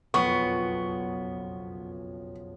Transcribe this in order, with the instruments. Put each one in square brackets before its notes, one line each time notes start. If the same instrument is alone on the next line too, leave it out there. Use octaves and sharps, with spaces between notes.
[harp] F#1 B1 F2 [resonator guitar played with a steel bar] B3 [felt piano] C#6